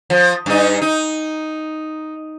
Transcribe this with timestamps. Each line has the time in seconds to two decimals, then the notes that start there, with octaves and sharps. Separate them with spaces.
0.10 F3
0.46 G2 D#4
0.82 D#4